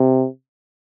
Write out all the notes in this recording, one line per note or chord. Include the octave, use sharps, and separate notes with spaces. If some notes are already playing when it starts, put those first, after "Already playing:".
Already playing: C3